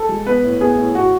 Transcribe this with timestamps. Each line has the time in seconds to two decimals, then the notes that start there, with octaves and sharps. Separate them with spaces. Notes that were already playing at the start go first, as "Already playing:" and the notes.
Already playing: A4
0.09 G#3
0.26 B3 B4
0.43 A2
0.60 B3 G#4
0.78 A2
0.95 A2 F#4